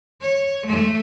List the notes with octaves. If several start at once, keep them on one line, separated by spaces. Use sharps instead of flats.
C#5
A3